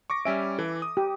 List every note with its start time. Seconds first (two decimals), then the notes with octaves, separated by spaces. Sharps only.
0.10 C#6 D6 A#6
0.25 G3 C#4 E5 G#5 D7
0.59 E3 A4
0.82 D#6
0.97 G4